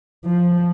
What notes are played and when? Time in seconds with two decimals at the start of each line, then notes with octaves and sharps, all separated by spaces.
0.25 F3